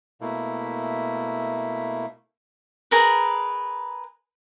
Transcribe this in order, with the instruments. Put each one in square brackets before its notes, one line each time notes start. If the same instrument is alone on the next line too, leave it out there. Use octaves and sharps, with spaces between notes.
[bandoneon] B2 A3 A#3 E4
[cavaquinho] G#4 A#4 B4